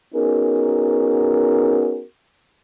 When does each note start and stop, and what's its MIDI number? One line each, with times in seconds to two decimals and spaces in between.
0.15 2.02 59
0.15 2.02 61
0.15 2.02 63
0.15 2.02 66
0.15 2.02 68
0.15 2.02 70